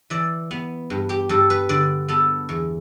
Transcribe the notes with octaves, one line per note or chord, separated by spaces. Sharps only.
E3 D5
B3
G2
G4
G2 A4
B4
D3 D5
B3 A4
E2